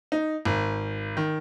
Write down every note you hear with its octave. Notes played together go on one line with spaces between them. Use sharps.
D#4
G#1
D#3